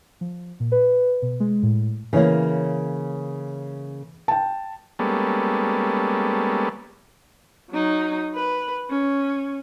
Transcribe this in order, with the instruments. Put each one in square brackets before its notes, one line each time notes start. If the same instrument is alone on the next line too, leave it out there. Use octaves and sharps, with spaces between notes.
[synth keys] F3
A#2
B4
B2
G#3
A2
[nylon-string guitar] C#3 A#3 [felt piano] E3 C#5
[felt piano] G5 A5
[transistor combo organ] G3 G#3 A#3 B3 C#4 A4
[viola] F#3 D#4
B4
C#4